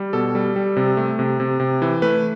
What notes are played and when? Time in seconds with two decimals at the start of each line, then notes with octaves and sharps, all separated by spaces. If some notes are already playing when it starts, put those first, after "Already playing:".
Already playing: G3
0.13 B2 A4
0.35 G3
0.56 G3
0.77 C3
0.97 A3
1.19 C3
1.40 C3
1.60 C3
1.82 E3
2.02 A3 B4